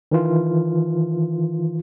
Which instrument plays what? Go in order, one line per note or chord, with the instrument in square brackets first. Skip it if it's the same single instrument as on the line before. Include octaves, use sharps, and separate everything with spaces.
[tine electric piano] D#3 E3 F4